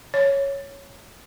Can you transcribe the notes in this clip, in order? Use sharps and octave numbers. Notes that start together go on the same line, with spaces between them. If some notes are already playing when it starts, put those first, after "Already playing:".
C#5